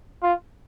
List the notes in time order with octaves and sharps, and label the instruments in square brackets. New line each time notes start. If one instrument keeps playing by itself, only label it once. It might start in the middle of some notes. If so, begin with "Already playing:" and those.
[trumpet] F4